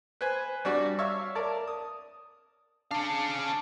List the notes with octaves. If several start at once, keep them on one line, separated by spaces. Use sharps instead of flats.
B4 C5 G#5
G3 D4 F#4 D5
C#5 E5 F5 C#6
A#4 D5 A5
D#6
C#4 D4 F5